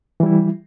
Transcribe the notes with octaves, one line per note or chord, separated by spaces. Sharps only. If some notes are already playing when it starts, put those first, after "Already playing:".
E3 G3 E4